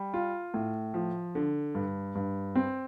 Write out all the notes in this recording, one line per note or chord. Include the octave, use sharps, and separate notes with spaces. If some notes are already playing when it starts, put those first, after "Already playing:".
Already playing: G3
F4
A2
F3
D3
G2
G2
C4